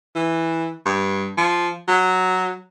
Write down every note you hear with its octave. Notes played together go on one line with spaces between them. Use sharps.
E3
G2
F3
F#3